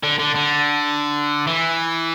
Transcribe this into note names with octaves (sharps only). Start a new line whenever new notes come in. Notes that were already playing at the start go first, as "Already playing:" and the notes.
D3
D3
D3
E3